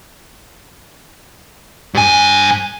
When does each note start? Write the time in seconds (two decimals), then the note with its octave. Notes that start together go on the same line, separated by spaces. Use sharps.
1.94 G2 G#5